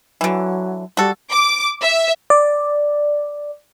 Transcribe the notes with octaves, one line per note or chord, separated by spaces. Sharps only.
D3 E3 F#3
G3 F#4 A4
D6
E5
D5